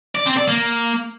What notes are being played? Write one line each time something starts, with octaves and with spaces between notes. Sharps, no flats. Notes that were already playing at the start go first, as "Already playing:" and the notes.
D5
C4
D5
A#3